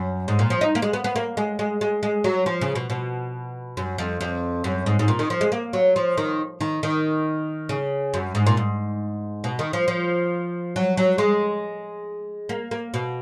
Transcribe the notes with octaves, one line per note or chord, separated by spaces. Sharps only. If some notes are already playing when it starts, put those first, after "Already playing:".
Already playing: F#2
G#2
A#2
F3
D#4
A#3
G#3
B3
B3
A#3
G#3
G#3
G#3
G#3
F#3
F3
C#3
B2
B2
F#2
F2
F2
F#2
G#2
G#2
A#2
D#3
F3
G#3
A#3
F#3
F3
D#3
D#3
D#3
C#3
F#2
G#2
A#2
G#2
B2
D#3
F3
F3
F#3
F#3
G#3
A#3
A#3
B2